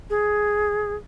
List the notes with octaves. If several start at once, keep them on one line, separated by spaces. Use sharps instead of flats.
G#4